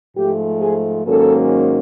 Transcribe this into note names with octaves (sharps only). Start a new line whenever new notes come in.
G#2 F3 A3 G4
G#4
G#2 D#3 F#3 A#3 C#4 A4